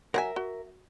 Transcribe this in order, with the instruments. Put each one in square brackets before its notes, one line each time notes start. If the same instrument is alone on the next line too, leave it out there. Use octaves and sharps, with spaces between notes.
[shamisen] F#3 F#5 G#5 [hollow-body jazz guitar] A#4 E5
[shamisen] F#4